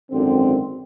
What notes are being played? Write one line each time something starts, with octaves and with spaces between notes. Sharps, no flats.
G#1 F#2 D3 C4